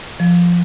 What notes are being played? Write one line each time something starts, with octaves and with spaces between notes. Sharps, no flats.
F3